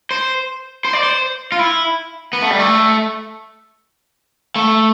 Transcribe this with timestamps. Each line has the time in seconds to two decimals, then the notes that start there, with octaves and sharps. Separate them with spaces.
0.11 C5
0.85 C5
0.93 D5
1.03 C5
1.52 F4
1.59 E4
2.33 B3
2.42 A3
2.50 G3
2.59 A3
4.56 A3